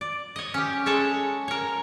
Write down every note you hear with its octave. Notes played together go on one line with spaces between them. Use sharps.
D5
C#5 D#5
C#4 G4
G#3 A4 C#5 A5
A#4 C#5